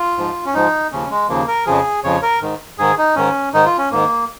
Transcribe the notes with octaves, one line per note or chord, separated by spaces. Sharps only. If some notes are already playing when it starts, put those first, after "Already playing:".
Already playing: F4
G#2 F3
C#4
G#2 F3 D#4
D#2 C#3 F3 C#4
G#3
D#2 C#3 F3 A#3
A#4
F2 C#3 F3 G#4
F2 C#3 F3 C#5
A#4
G#2 D#3
G#2 D#3 G#4
D#4
G#2 D#3 C#4
G#2 D#3 D#4
F4
C#4
G#2 D#3 A#3